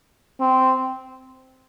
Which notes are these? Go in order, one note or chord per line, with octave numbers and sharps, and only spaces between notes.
C4